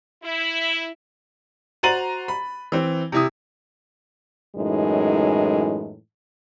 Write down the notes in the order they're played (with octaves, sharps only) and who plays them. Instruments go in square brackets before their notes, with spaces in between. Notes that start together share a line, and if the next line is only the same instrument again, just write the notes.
[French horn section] E4
[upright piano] F#4 C5 A#5 A6 D#7 F#7
B5
E3 C4
C3 E4 D#6
[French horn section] F#2 A2 E3 G#3 D#4